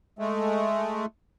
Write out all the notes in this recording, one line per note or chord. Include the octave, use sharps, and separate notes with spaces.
G#3 A3